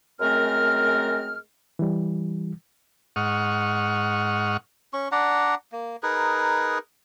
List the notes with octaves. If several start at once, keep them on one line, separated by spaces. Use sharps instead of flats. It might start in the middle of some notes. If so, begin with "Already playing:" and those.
F#2 G#3 A3 C4 A#4 F6
E3 G3
G#2 F#5 C#6 D#6 F6
C#4 C#6
D4 D5 F#5 A#5
A#3
D#4 G#4 A#4 B4